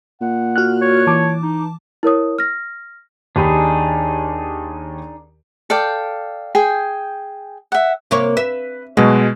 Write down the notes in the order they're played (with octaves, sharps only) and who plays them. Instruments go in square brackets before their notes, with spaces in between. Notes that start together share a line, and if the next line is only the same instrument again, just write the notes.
[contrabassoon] A#2 [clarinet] F#5
[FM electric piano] F#4 F6 F#6
[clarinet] C#5
[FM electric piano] E3 A5 D6
[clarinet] D#4
[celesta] E4 A#4 C#5 D#6
F6 A#6
[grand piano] D#2 G4 B5 [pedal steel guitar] D4 D#4 G#4
[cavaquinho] A4 D5 F5 G5
G#4 G5 G#5
E5 F#5
[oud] C3 A#3 C#5
[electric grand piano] B4 [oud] E5
[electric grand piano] B2 G#3 [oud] F#3